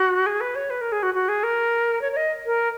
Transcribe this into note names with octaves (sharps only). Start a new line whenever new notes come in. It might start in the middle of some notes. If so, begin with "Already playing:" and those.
Already playing: F#4
G#4
B4
C#5
B4
A#4
G#4
F#4
F#4
G#4
A#4
C#5
C#5
D#5
A#4